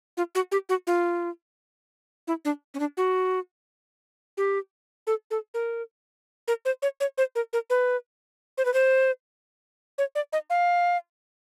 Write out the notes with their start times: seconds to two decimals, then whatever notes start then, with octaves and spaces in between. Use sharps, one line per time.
0.17 F4
0.35 F#4
0.52 G4
0.69 F#4
0.87 F4
2.27 E4
2.45 D4
2.74 C#4
2.79 D4
2.97 F#4
4.37 G4
5.07 A4
5.31 A4
5.54 A#4
6.48 A#4
6.65 C5
6.82 C#5
7.00 C#5
7.18 C5
7.35 A#4
7.53 A#4
7.70 B4
8.58 C5
8.65 B4
8.74 C5
9.98 C#5
10.15 D5
10.33 D#5
10.50 F5